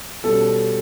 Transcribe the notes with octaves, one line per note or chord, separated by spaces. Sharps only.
B2 G3 C#4 A4